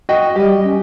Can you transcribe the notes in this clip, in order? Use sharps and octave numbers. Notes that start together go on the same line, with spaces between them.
F#4 D#5 G5
G3 G4 D#5
C#4